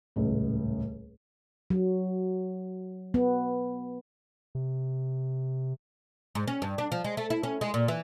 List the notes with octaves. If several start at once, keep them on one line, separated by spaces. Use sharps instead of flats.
D#1 C#2 A2
F#3
B3
C3
G#2
C#4
G2
D4
F3
G#3
A3
E4
C#4
G#3
A#2
E3